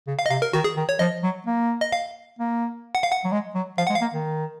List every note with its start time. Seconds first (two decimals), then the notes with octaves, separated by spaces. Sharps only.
0.07 C#3
0.19 F5
0.26 D#5
0.30 C3 F5
0.42 A#4
0.53 D#3 F#4
0.64 G#4
0.77 D#3
0.89 C#5
0.99 F3 D#5
1.23 F#3
1.46 A#3
1.81 D#5
1.92 F5
2.39 A#3
2.95 F#5
3.03 F5
3.12 F#5
3.25 F#3
3.32 G#3
3.55 F#3
3.78 F3 F5
3.87 G#3 F#5
3.95 F5
4.01 A#3
4.13 D#3